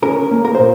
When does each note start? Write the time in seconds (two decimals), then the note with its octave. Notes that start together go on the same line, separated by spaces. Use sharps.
0.02 C#4 A#4
0.31 A#3
0.45 A#4
0.55 C5
0.59 A#2